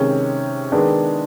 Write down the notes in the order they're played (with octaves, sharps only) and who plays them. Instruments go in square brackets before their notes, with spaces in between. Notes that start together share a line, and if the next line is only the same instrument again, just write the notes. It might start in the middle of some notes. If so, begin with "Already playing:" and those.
Already playing: [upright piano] C3 D#3 G#3 C#4
D#3 G#3 B3 D4